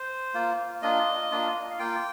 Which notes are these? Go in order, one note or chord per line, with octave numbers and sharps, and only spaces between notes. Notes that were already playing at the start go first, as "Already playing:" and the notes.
Already playing: C5
A#3 F4
A#3 D4 F4 D#5
A#3 D4 F4
F5
A#3 F4 G5